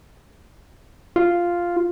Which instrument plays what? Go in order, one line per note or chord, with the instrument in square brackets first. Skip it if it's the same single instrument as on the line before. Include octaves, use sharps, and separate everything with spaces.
[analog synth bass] F4